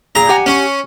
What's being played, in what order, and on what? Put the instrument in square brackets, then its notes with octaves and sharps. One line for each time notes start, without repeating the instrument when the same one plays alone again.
[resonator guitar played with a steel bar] A#2 G#4 [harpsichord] A#5
[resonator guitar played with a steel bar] G4 F#5 G#5
[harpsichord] C#4